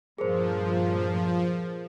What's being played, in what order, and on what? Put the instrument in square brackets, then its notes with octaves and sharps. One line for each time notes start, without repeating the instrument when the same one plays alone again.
[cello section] G2 A#2 [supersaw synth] F3 [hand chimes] G#4 A#4 C5